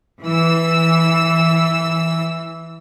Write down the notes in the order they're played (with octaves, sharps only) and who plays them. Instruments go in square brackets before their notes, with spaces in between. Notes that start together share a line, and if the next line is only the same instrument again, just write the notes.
[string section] E3 E6